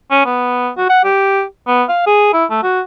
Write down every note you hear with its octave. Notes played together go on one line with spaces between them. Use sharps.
C#4
B3
F#4
F#5
G4
B3
F5
G#4
E4
A3
F#4